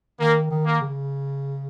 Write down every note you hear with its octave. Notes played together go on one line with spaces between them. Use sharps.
D#3 A#3
D#3
A#3
C#3